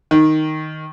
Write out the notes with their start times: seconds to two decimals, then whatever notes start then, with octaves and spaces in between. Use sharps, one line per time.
0.11 D#3